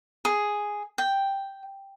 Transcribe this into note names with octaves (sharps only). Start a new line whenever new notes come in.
G#4
G5